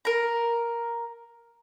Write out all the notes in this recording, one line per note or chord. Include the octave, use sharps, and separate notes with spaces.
A#4 A#5